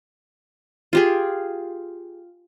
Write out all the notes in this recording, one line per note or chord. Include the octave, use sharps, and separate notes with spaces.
F4 G4 G#4